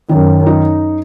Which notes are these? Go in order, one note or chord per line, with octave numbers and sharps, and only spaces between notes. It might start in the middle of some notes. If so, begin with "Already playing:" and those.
F#2 D#3
D#4